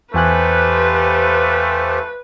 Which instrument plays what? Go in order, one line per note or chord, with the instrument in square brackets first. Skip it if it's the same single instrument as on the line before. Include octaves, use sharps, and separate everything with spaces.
[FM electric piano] E2 G#5 F#6 [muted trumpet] A3 [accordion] F4 G4 C5 [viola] B4